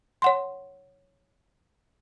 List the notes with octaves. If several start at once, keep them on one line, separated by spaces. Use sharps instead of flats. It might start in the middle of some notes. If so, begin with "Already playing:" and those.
C#5 F#5 C6